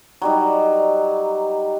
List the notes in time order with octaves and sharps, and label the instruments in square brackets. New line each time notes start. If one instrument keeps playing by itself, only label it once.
[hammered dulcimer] F#3 G3 D#4